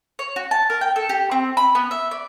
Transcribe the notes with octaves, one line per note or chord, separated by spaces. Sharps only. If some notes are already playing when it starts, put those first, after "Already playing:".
C#5
F#4
A5
A#4
G5
A4
G4
C4
B5
B3
E5
D5